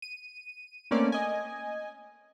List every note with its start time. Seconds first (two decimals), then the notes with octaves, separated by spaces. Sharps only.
0.02 D#7
0.91 A3 A#3 C4 C#4 D5
1.12 D#5 G#5